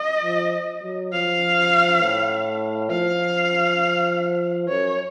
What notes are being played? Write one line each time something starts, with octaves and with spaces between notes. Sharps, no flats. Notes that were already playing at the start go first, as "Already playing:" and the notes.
Already playing: D#5
F3
F#3
F3 F5
A2
F3 F5
F#2 C#5